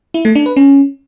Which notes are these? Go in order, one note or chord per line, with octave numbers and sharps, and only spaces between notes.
E4
A3
D4
B4
C#4